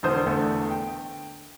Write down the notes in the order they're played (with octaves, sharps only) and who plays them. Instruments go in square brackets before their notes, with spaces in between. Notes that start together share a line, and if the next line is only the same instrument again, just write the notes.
[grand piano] E1 D3 E3 C5 D#6 G6
E2 D3 A3
G5